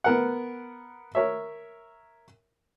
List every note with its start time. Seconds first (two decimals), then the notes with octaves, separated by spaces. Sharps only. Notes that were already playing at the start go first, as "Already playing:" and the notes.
0.04 B3 A#4 F#5
1.15 A#4 C#5 E5